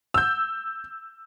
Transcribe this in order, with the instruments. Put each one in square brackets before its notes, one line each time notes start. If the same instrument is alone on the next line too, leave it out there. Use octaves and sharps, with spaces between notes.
[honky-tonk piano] E6 G6